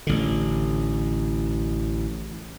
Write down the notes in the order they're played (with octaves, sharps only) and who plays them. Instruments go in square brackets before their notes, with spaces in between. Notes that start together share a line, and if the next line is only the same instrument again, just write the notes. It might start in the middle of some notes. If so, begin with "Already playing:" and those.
[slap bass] A1 D3